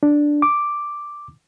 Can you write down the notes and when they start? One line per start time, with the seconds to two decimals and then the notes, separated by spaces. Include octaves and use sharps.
0.03 D4
0.42 D6